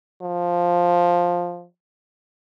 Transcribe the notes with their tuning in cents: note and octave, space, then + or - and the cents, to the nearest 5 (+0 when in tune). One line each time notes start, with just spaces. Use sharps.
F3 +5